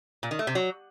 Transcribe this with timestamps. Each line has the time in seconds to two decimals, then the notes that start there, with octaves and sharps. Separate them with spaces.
0.23 A#2
0.31 D#3
0.39 A3
0.47 C3
0.55 F#3